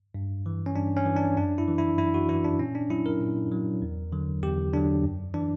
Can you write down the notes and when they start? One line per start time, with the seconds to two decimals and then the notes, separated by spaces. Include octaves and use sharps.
0.15 G2
0.46 E3
0.66 C#4
0.76 G2 D4
0.96 C#4
1.06 E3
1.16 D4
1.37 F#2 D4
1.58 E4
1.68 E3
1.78 E4
1.98 F#2 E4
2.14 F#4
2.29 E3 E4
2.44 D4
2.59 A#2 C#4
2.75 D4
2.90 F#3 E4
3.06 A#4
3.21 A#2
3.52 F#3
3.82 E2
4.12 D3 F#3
4.43 E2 G4
4.73 D3 F#3 D4
5.04 F#2
5.34 E3 D4